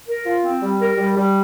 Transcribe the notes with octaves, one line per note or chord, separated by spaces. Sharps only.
A#4
F4
C4
G3
A#4
G3
G3